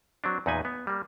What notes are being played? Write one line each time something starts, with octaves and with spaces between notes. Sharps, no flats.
F#3 C4 D4
E2 A#2 D#4 B4 G#5
B3
G3 A#3